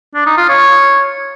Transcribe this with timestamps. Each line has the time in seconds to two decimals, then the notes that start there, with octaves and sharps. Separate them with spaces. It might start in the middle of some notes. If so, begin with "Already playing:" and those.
0.15 D4
0.26 D#4
0.38 F4
0.49 C#5